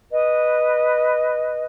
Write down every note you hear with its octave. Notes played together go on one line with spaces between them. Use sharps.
B4 D#5